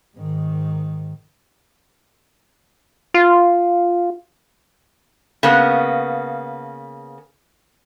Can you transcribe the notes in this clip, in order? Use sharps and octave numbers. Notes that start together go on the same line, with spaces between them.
G#2 D#3
F4
C#3 A#3 B3